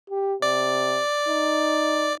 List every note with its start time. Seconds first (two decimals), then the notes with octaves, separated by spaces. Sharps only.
0.10 G4
0.42 C3 D5
1.29 D#4